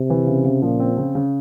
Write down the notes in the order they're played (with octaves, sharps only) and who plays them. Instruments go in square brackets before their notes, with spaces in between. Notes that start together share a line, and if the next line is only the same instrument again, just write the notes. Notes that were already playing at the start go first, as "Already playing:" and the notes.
Already playing: [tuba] C3
[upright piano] E3
C#3
C#3
[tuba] A#2 [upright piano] F3
[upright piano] C4
C#3
C#3